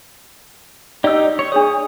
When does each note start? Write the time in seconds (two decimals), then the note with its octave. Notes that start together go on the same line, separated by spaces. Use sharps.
1.04 D#4 G4 D5 E6
1.39 C#5
1.52 D4 G#4 C#5 D#6